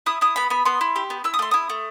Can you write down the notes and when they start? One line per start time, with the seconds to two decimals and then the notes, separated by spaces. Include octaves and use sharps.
0.06 E4 D#6
0.21 E4 D#6
0.36 B3 B5
0.50 B3 B5
0.65 B3 C6
0.81 E4
0.96 G4
1.10 B3
1.24 E4 E6
1.34 D#6
1.39 A3 C6
1.51 E4 D#6
1.70 A3